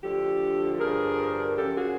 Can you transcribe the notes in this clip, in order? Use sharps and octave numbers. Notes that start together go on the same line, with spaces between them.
D2 D3 F3 G4 A4
G2 D3 F3 G#4 A#4
F#2 C#3 F3 G4 A4
F#4 G#4